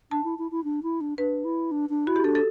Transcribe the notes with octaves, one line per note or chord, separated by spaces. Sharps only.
D4 A5
E4
E4
E4
D4
E4
D4
D4 B4
E4
D4
D4
E4 F#4
G4
D4 A4
A4